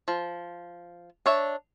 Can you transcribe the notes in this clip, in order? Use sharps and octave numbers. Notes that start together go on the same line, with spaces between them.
F3
D4 C#5 E5